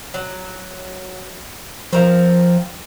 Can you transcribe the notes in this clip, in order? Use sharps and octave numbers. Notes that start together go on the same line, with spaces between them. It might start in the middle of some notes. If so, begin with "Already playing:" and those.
F#3
F3 C4 A#4 F5